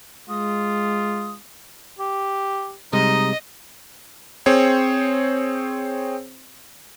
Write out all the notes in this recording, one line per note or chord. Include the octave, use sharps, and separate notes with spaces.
G#3 F4 D#6
G4
C3 G3 G#3 D#4 D#5
C4 G#4 C5 C#5